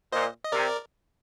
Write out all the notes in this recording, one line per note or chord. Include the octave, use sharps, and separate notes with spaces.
A#2 C5 D#5
D#5
C3 A#4 D5